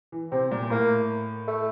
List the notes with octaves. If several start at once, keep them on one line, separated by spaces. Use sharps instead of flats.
E3
C3 C4
A#2
A2 A#3
A3